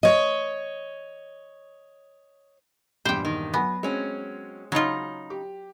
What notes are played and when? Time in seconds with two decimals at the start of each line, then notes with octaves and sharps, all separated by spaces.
0.03 C#5 D#5
3.05 A#1 E2 G2 G3 C5 G5
3.25 D#3
3.54 F#3 B3 G#5 A#6
3.83 F#3 G#3 C4 C#4 C#5
4.72 C#3 F#3 D#4 F4
5.30 G4